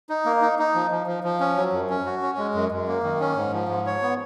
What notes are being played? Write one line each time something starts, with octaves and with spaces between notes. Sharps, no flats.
D#4
A#3
D#4
D#4
F3
F3
F3
F3
C#4
F#3
F#2
C#4
F#4
C#4
G#3
F#2
F#2
A#3
D#3
C#4
G#2
F3
G#2
C#5
B3